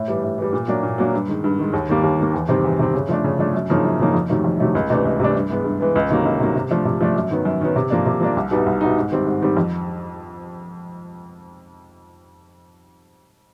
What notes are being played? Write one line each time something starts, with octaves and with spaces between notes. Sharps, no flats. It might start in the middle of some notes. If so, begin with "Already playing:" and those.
Already playing: A2
E3 G3
A2
E3 G3
A#2
F#3 A#3 D4
A#2
F#3 A#3 D4
G2
D#3 G#3
G2
D#3 G#3
D#2
D#3 G3 A#3
D#2
D#3 G3 A#3
E2
C3 D#3 G3 C4
E2
C3 D#3 G3 C4
C#3
F3 A3 D4
C#3
F3 A3 D4
F#2
C#3 F3 A#3 D#4
F#2
C#3 F3 A#3 D#4
F2
C3 D#3 F#3 A3
F2
C3 D#3 F#3 A3
C#2
C3 E3 A3 D4
C#2
C3 E3 A3 D4
G2
E3 G#3 B3
G2
E3 G#3 B3
C#2
C3 D#3 F#3 A#3
C#2
C3 D#3 F#3 A#3
C3
F3 A3 D4
C3
F3 A3 D4
F#2
D#3 F#3 B3
F#2
D#3 F#3 B3
C3
F3 A#3 D4
C3
F3 A#3 D4
C2
B2 G3 B3 D#4
C2
B2 G3 B3 D#4
G#2
D#3 G3 C4
G#2
D#3 G3 C4
F2